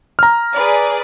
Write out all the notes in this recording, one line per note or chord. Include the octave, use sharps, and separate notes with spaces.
A#5 F6
G#4 B4 D5